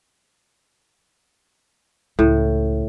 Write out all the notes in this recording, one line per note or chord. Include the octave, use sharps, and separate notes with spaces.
C#2 A2